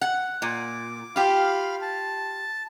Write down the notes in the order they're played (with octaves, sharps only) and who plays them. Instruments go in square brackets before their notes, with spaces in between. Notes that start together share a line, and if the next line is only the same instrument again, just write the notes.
[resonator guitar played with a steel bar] F#5
[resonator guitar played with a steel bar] A#2 [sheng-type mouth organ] D6
[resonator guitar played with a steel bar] F4 G4 [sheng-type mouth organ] F5 B5 F6
[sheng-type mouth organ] A5